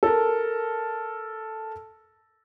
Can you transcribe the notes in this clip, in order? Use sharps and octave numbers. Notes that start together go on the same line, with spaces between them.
A4 A#4